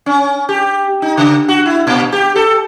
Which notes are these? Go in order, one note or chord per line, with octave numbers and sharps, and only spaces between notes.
C#4
G4
D#4
C#3
F#4
E4
A#2
G4
A4